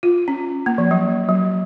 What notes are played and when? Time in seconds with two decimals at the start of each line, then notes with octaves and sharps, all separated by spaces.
0.03 F4
0.28 C#4
0.66 A#3
0.78 F3
0.91 F#3
1.29 F#3